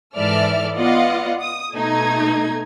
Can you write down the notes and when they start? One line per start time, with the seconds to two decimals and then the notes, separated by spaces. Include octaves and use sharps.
0.16 G#2 E3 A4 D5 E5 F6
0.77 B3 F4 D5 D#5 F5 F#5
1.40 D#6
1.74 B2 A3 D#4 G#6